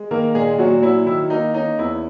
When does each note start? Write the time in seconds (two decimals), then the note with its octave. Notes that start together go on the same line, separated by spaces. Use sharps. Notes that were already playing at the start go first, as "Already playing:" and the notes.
Already playing: G#3
0.11 D#3 A#3 A#4
0.35 A#2 G#3 G#4
0.58 A#2 F#3 F#4
0.82 F#3 E4
1.06 D#3 E4
1.30 A#3 D#4
1.54 C#4 D#4
1.78 E2 E4